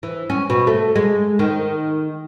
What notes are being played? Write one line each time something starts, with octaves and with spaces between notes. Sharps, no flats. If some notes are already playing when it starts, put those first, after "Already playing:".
E3
C#4
B2
A3
G#3
D#3